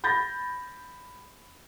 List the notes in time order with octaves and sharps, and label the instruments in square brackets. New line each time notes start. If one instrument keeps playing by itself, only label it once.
[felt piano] B5 G6 A6 A#6